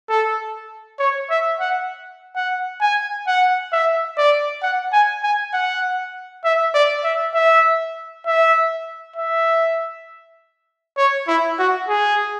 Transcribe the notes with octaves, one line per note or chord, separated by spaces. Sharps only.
A4
C#5
E5
F#5
F#5
G#5
F#5
E5
D5
F#5
G#5
G#5
F#5
E5
D5
E5
E5
E5
E5
C#5
E4
F#4
G#4